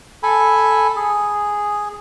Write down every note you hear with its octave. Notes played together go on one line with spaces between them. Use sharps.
A4 G#5 B5
G#4